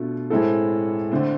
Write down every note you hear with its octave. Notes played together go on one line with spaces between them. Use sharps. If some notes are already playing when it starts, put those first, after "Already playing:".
Already playing: B2 A3 D4 F4
A2 G#3 C4 E4 A4
D3 A3 C4